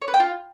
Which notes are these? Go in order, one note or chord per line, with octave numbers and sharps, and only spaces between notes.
C#5
B4
G5
F4